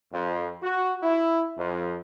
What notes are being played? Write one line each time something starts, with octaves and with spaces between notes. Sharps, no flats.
F2
F#4
E4
F2